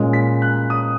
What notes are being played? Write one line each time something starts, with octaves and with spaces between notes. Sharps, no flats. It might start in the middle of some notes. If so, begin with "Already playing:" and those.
Already playing: A#2 G#3 C#4
B6
F#6
D#6